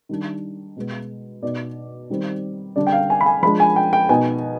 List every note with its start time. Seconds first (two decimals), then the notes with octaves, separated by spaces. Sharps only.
0.09 D#3 G3 D4
0.76 B2 G#3 B3
1.43 B2 B3 D#4 D5
2.10 D#3 G3 C4
2.76 D3 G3 D4 D5
2.87 G5
2.92 F5
3.10 G#5
3.21 B5
3.26 G#5
3.43 F3 G#3 D4 B5
3.60 G#5
3.76 G5
3.93 G5
4.09 B2 B3 D#4 G#5